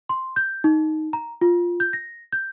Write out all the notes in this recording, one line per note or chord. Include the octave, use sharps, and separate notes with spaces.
C6
G6
D#4
A#5
F4
G6
A#6
G6